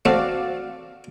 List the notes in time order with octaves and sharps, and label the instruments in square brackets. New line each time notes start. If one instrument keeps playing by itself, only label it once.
[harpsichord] A3 C4 [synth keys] F#4 D5 F5